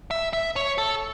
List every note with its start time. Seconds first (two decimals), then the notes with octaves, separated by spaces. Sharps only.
0.11 E5
0.33 E5
0.56 C#5
0.78 A4